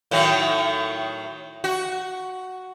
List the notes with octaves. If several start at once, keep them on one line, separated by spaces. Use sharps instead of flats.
A2 D#3 F#3
F#4